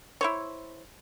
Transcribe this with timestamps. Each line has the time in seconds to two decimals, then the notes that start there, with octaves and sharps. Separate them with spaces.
0.21 E4 C5 C#5